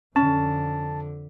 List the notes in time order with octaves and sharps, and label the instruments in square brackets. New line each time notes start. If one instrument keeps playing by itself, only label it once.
[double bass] F2 D3 [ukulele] C#4 [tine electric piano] A5